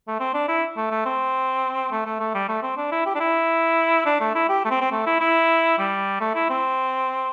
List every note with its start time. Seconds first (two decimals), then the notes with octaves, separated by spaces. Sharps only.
0.07 A3
0.19 C4
0.34 D4
0.48 E4
0.76 A3
0.91 A3
1.05 C4
1.91 A3
2.05 A3
2.20 A3
2.34 G3
2.48 A3
2.62 C4
2.77 D4
2.91 E4
3.06 G4
3.15 D4
3.20 E4
4.05 D4
4.20 A3
4.34 E4
4.49 G4
4.65 A3
4.70 C4
4.81 C4
4.92 A3
5.06 E4
5.20 E4
5.78 G3
6.20 A3
6.35 E4
6.49 C4